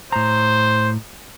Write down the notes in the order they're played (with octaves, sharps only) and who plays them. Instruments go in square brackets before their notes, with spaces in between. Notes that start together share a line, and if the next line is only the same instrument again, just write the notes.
[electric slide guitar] A2 A#5 [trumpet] C5